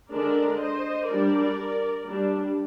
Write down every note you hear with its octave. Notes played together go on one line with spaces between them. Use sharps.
D3 G#3 D4 A#4 D5
C5 D#5
G3 D4 A#4 D5
G3 D4